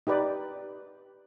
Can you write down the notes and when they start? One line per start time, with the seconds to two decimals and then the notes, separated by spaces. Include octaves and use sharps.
0.07 D#4 G4 B4 D5